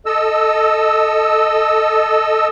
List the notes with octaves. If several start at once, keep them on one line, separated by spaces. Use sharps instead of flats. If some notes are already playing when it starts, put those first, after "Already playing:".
A4 D#5 E6